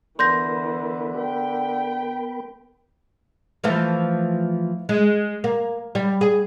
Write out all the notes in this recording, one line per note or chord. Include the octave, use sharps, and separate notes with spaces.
D3 E3 B3 A#4 B5 C6 G6 A#6
G5
E3 F3 A3
G#3
A#3
G3
G#4